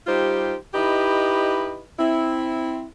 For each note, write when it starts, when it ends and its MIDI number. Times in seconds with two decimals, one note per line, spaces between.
0.07 0.55 55
0.07 0.55 63
0.07 0.55 65
0.07 0.55 67
0.07 0.55 72
0.75 1.82 63
0.75 1.82 64
0.75 1.82 67
0.75 1.82 71
0.75 1.82 75
1.98 2.85 60
1.98 2.85 64